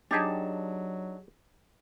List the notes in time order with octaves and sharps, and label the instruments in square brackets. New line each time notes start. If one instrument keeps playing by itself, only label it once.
[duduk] F#3 [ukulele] D4 D#4 A5 [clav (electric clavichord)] G4 G#4